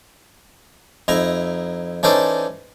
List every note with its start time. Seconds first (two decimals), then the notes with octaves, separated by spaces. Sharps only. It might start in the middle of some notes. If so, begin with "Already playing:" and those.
1.08 F2 D#4 E4 A#5
2.03 E3 C#4 D#4 A4 C5 D5